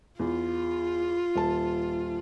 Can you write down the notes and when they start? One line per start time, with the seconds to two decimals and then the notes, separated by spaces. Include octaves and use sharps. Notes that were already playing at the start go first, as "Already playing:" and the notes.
0.19 E2 F4
1.36 D#1 A5